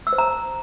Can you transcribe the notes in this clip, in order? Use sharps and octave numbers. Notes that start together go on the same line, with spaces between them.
E6
C5
A#5